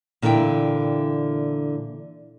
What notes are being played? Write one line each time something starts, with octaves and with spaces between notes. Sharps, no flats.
A#2 D3 E3 E4 G5